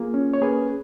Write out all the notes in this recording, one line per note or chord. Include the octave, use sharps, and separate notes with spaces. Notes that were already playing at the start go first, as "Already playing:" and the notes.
Already playing: A#3 F4 G#4
C#4
C#5
A#3 G#4 B4